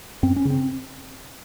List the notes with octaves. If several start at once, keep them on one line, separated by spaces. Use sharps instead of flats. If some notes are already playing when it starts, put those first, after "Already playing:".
F#2 C4
C#4
C#3
C4